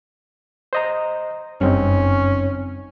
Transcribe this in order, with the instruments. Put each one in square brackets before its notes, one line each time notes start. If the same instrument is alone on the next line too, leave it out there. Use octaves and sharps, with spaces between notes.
[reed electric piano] C5 D#5 A#5
[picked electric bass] F#1 [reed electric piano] G2 C4 D#4 [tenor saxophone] C#4